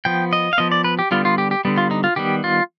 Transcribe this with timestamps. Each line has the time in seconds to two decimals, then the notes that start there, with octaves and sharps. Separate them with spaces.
0.05 F3 B3 G5
0.33 D#5
0.53 F5
0.58 F3 B3 D#5
0.72 D5
0.84 B4
0.99 G4
1.11 D3 G3 B3 F4
1.25 F4
1.38 G4
1.51 G4
1.65 D3 G3 B3
1.78 F4
1.91 D#4
2.04 F4
2.16 D#3 G3 B3 G4
2.44 F4